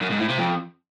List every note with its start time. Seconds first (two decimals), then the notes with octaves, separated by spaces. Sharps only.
0.02 F#2
0.11 G#2
0.20 A2
0.29 C3
0.38 F2